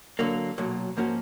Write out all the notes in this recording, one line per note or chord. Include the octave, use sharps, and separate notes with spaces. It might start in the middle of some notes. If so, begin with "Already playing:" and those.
D3 F#3 A#3
B1 A#2 F#3
G#2 F3 A#3 C#4 F#4